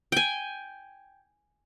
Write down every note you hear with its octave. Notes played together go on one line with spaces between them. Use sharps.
G5 G#5